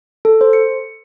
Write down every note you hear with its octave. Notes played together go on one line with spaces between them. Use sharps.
A4
C5
C#7